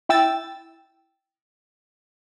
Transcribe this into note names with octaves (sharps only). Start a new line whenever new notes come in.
E4 G5 E6 A6